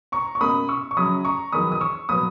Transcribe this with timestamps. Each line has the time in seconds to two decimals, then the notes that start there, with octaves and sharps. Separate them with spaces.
0.12 A#5 C#6
0.35 C#6
0.41 B2 A#3 C#4 B5 D#6
0.69 C#6 E6
0.91 C#6
0.97 F#2 C#3 F#3 C#4 B5 D#6
1.25 A#5 C#6
1.52 E2 D#3 F#3 B5 D#6
1.72 D#6
1.81 C#6 E6
2.09 A#2 F#3 B3 B5 D#6